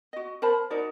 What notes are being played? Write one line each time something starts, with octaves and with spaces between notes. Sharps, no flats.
F#4 D#5
A#4 C5 A5 B5
D#4 F#4 A#4 D5